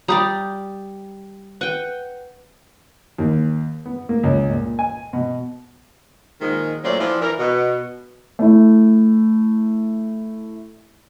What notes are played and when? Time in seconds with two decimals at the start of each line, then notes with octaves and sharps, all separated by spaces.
0.08 G3 G4 D5 A#5 D#6 G6
1.61 B4 F#5 G5 F#6 D#7
3.18 D#2
3.86 B3
4.09 A#3
4.23 C#2
4.50 A#2
4.79 G#5
5.13 B2
6.41 A#2 D#3 F3 G#3
6.84 A#2 F#3 A3 C#4 C5 D5
7.00 E3 F3 C4 D4 F4
7.21 E3 A#4
7.39 B2
8.39 A3 E4